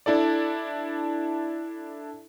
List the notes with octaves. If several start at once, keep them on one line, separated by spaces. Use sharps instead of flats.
D4 E4 A4 D5